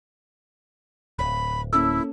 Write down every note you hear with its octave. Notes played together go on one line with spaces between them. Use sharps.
D1 B5
A#3 C#4 E4 A4 E6